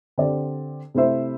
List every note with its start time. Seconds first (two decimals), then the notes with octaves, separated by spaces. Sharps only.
0.18 D3 C4 G4 D5
0.95 C3 A3 E4 C5 E5